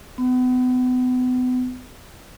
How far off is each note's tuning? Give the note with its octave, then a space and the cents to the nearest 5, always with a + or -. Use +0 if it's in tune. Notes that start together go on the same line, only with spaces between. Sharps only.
B3 +35